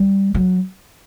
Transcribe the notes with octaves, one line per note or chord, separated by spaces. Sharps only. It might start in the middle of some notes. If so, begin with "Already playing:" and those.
Already playing: G3
F#3